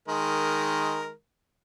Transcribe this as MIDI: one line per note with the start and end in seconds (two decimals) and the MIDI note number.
0.08 1.11 51
0.08 1.11 56
0.08 1.11 70